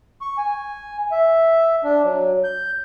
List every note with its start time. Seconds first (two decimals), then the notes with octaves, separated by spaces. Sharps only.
0.21 C#6
0.38 G#5
1.12 E5
1.84 D4
2.04 F#3
2.44 G6